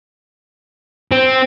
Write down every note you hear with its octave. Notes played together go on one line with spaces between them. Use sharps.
C4